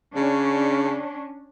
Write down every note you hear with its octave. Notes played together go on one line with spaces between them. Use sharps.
C#3 C#4 D4 C#5